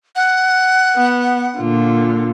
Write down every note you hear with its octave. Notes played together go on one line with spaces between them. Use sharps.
F#5
B3
A#2 D3 F4